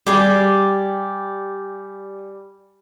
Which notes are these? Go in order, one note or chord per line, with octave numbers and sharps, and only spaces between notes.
G3 G4 G#4 D5